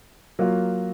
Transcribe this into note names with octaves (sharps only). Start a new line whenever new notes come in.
F#3 A#3 F4